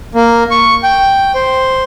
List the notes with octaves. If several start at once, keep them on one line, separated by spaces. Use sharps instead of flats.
A#3
C#6
G5
C5